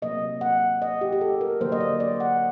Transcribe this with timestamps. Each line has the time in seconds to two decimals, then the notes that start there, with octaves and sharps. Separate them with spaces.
0.02 C3 F#3 A#3 D#5
0.41 F#5
0.82 D#5
1.01 G4
1.12 G4
1.21 A4
1.41 A#4
1.60 D3 F#3 A#3 C5
1.72 D#5
1.80 D5
2.00 D5
2.20 F#5